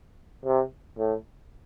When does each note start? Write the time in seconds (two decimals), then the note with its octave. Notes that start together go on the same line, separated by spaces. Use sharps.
0.45 C3
0.98 A2